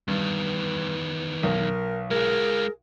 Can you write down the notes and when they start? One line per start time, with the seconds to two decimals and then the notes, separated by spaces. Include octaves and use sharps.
0.08 E2 G2 D#3 B4
1.43 B1 A#4
2.11 G#3 F4 G#4 A#4